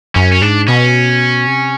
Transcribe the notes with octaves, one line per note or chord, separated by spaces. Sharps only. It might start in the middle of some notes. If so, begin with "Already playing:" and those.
F#2 C#4
C#4
G#2 D4
B2 C#4
C3